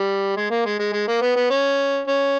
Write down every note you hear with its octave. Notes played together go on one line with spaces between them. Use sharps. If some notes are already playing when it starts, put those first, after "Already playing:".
Already playing: G3
G#3
A#3
G#3
G#3
G#3
A#3
B3
B3
C#4
C#4